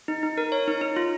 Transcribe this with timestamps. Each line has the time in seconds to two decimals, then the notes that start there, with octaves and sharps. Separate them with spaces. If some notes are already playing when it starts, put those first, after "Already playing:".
0.08 D#4
0.23 D#4
0.38 A#4
0.52 C#5
0.68 D#4
0.81 D#4
0.96 F4